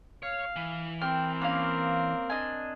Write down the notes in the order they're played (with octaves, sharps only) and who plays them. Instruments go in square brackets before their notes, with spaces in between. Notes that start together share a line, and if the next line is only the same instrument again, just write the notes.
[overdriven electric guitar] C#5 [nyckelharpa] F5
[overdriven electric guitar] E3
[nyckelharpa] C4 A#4 [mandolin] G5 F6
[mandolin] A#3 C#4 F5
D4 D#5 G#5